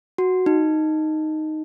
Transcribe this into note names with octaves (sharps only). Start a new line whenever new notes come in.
F#4
D#4